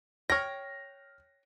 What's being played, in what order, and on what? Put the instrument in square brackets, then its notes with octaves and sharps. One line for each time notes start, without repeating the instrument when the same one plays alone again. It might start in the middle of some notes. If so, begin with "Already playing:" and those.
[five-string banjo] C#5 G5 [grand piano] F6 A#6